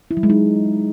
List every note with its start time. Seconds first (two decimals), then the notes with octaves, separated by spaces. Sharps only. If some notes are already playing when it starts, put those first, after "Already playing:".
0.11 E4
0.17 F#3
0.23 G#3
0.30 D#4